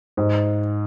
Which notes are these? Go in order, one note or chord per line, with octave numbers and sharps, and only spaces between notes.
G#2